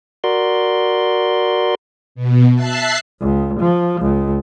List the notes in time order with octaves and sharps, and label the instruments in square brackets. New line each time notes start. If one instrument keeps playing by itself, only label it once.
[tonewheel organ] F#4 A#4 D5 C6
[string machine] B2
E5 A5 F#6 C7
[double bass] C#2
F3
C#2